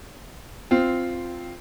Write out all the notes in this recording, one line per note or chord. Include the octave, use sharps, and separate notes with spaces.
C4 F4